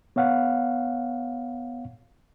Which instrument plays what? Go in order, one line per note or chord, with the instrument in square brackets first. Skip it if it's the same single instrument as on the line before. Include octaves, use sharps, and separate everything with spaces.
[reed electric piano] B3 C#5 F5 F#5